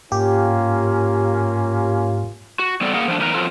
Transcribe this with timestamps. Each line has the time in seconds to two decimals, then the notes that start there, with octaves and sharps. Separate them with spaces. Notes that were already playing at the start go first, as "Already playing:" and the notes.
0.12 G#2 A#3 C#4 F4 G4
2.59 F#4
2.81 G3 B3 C4 A4 D5
2.94 A#3 G#4 A#4 F#5
3.08 F3 A3 C4 D4
3.20 E2 D#4 A#4 B4 A#5
3.34 F3 F#3 C4 F4 A4 A#4